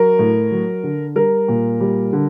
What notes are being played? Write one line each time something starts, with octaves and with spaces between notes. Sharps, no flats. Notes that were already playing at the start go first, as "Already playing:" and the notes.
Already playing: F#3 A#4
A2
F#3
D3
G3 A#4
A#2
G3
D3